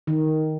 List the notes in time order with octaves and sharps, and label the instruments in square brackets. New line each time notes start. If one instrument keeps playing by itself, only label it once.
[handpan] D#3